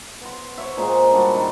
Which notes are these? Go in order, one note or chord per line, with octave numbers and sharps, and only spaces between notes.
B3 C6
C#5 E5
A#2 G#3 C5
G3 D4 F#4
D#3